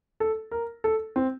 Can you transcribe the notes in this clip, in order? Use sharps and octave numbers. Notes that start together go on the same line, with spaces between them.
A4
A#4
A4
C4